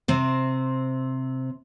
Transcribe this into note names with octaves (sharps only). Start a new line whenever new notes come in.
C3 C4